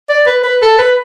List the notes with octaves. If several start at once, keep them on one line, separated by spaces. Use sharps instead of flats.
D5
B4
B4
A4
B4